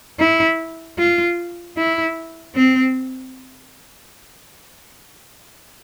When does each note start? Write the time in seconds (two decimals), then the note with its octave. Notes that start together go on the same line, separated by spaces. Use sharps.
0.20 E4
0.99 F4
1.78 E4
2.56 C4